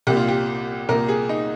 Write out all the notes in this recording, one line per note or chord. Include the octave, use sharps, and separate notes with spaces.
C2 A#2 G4
F4
G4
C2 A#2 A#4
G#4
D#4